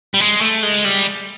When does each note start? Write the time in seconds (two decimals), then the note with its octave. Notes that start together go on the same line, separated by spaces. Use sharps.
0.14 G3
0.20 G#3
0.41 A3
0.63 G#3
0.85 G3